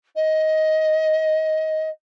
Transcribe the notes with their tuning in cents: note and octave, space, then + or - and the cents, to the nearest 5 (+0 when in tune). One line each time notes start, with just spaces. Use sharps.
D#5 +15